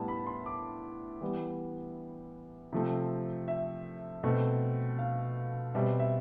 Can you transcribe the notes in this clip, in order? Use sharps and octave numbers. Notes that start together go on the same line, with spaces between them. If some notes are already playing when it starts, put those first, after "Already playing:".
Already playing: A2 G3 B3 A5
B5
C6
D6
E3 G3 B3
C3 F3 A3 C4
E5
B2 A3 C4
F5
B2 G3 C4 E5
E5